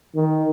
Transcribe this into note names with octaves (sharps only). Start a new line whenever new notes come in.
D#3